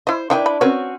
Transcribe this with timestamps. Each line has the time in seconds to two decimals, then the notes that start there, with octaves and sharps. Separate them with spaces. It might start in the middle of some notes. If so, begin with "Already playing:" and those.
0.07 E4 C5 D#5
0.30 D#3 D4 E4 B4 G5 G#5
0.46 B5
0.61 C4 C#4 F#4 A#4 B4 C#5